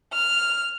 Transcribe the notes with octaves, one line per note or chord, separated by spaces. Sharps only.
F6